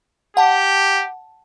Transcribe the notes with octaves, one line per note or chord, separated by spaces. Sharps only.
G4 F#5 A5